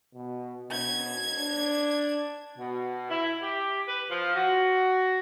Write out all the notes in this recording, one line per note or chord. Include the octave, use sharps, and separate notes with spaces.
B2
B2 G#6
D4
B2
E4
G4
B4
F3
F#4